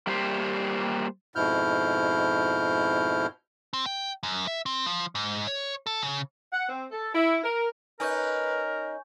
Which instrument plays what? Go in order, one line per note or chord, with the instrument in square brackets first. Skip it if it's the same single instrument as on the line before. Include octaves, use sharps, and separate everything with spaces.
[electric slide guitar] G3 A#3 G4 C5
[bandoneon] F2 G#2 B2 E4 F6 G6
[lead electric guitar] C4
G5
F#2
E5
C4
F3
G#2
C#5
A4
C#3
[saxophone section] F#5
C4
A4
E4
A#4
[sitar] C#4 D#4 [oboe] A#4 [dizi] B4 [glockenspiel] G#5 C#6 G6